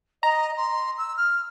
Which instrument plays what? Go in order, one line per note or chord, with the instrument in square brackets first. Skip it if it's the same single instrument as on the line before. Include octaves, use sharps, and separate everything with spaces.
[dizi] D#5 [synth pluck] A#5
[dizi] C6
E6
F6